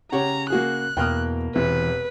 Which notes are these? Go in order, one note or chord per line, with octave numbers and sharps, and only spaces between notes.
C#3 G4 C#5 F#5 A#5
A#3 F#4 G#4 F#6
E2 B2 A#3 G5 D#6 F6
E1 C3 E3 B4